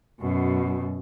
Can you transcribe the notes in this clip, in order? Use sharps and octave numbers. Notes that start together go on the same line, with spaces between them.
F#2 B2